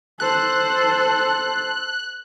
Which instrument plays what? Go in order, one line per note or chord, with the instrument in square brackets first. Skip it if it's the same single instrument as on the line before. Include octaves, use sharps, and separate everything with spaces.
[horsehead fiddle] A4 C5 [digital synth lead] F#6